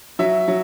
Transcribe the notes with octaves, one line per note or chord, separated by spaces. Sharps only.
F#3 E5
F#3